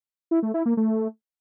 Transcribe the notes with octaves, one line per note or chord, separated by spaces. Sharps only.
E4
A3
E4
A#3
A3